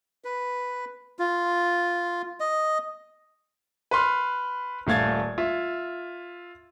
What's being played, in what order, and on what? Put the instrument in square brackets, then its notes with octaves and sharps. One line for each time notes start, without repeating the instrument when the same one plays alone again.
[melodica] B4
F4
D#5
[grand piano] B4 B5 C6 F6
D#1 A3 F5 G#6 A6
F4 E5